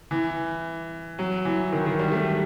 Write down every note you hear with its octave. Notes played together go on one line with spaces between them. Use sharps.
E3
F#3
E3
D#3
D#3
G3
A3